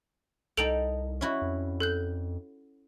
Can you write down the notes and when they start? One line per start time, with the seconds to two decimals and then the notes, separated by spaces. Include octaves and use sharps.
0.57 C2 D#4 A4 G5 A5 D7 F7
1.21 C#4 E4 F#4
1.42 F2
1.80 A4 F#6 G6